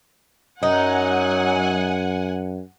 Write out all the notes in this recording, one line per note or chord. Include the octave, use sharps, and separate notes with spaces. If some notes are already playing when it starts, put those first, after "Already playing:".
F#2 F#3 D#4 F#5 G#5